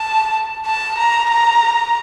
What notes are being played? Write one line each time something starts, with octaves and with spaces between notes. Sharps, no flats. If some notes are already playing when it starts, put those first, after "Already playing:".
Already playing: A5
A5
A#5
A#5